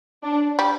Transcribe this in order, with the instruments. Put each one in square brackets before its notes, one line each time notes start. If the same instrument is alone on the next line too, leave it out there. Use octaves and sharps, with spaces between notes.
[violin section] D4
[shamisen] G3